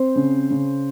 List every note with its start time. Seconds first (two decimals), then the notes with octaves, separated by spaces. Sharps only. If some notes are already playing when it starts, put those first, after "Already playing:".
Already playing: C4 C5
0.16 C#3
0.51 C#3